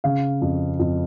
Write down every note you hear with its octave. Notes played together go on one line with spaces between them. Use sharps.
C#3 F5
F2
F2